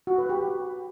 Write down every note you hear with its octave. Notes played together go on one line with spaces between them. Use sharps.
F#4
B4
G4